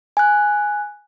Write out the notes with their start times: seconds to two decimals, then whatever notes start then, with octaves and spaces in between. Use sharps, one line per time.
0.17 G#5 F#6